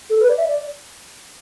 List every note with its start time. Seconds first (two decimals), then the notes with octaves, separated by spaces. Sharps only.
0.10 A4
0.20 B4
0.29 D5
0.38 E5
0.48 D5